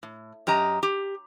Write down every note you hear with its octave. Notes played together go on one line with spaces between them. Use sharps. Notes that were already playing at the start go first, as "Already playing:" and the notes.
A2
F#2 G4 D#5 A#5
G4